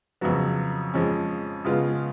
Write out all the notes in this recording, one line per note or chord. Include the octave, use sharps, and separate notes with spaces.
F2 C#3 F#3 B3
F2 F3 G#3 C#4
C#3 G#3 B3 F4